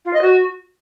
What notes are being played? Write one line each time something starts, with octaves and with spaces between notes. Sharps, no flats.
F4
D#5
F#4